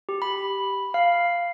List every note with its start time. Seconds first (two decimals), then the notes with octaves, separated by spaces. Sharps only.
0.09 G4
0.22 B5
0.94 F5